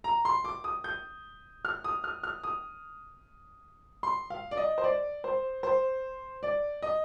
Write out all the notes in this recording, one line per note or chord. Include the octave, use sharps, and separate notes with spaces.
A#5
C6
D6
D#6
G6
F6
D#6
F6
F6
D#6
C6
F5
D5
D#5
C5
D5
C5
C5
D5
D#5